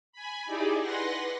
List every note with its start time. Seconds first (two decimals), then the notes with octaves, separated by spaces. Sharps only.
0.12 G#5 B5
0.46 D#4 E4 G4 G#4 D5
0.80 B4 F#5 C6 A#6